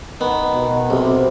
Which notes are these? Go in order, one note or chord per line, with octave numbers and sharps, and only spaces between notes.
D#3 B3
B2
B1 C3